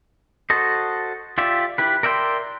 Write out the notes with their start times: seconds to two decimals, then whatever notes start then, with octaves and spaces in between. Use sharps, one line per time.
0.50 F#4 A4 C5 D#5
1.38 F4 G4 D5 E5
1.78 E4 G4 B4
2.03 A#4 D5 E5 G5 C6